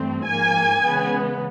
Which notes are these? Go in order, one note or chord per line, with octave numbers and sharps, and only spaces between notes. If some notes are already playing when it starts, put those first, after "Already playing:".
Already playing: G2 E3 A3 C4
G#2 F3 A#3 G#5
C#3 E3 G#3 B3